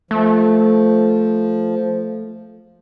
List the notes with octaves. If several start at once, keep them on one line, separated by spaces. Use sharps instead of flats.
F3 A3